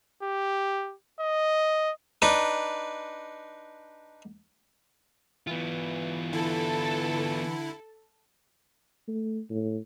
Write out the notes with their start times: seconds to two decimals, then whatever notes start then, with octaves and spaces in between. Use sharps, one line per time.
0.23 G4
1.20 D#5
2.22 D4 D#4 B4
5.47 E3 B3 F4
6.33 D3 E4 A4
9.08 A3
9.50 A2